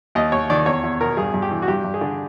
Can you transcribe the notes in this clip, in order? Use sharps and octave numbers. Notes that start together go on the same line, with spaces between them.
D#2 D#5
D#2 C#5
D#3 D5
E2 C#5
E2
B2 A#4
G2 G#4
G2
G4
E3
F#4
G2 G4
G2
G#4
D3